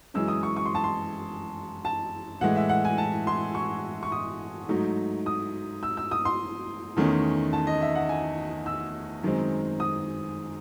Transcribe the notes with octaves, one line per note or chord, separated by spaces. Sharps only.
F#2 E3 G#3 C#4 E6
D#6
C#6
C#6
C6
A5
C6
A5
A2 E3 G#3 F#5
E5
F#5
G#5
A5
C6
C#6
C#6
D#6
G#2 F#3 A3 D#4
D#6
E6
E6
D#6
C6
E2 D#3 A3 C#4
A5
D#5
E5
F#5
G#5
E6
F#2 D#3 G#3 C4
D#6